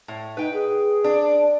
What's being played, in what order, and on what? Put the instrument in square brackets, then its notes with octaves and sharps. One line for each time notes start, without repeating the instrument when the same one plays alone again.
[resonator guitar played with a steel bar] A2
[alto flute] D#4 [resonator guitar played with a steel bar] B4 G5
[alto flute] G#4
[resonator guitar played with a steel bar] D4